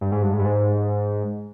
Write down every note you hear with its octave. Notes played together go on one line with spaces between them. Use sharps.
G2
G#2
G2
G#2
G2
G#2